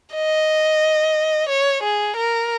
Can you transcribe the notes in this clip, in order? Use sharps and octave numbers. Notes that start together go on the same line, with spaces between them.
D#5
C#5
G#4
A#4